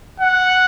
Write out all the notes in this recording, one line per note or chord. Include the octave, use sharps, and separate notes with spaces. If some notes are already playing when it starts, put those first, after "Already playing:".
F#5